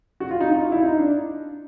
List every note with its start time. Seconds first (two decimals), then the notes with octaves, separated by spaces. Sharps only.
0.20 F#4
0.31 F4
0.41 D#4
0.51 D#4
0.61 F4
0.72 E4
0.82 D#4
0.98 D4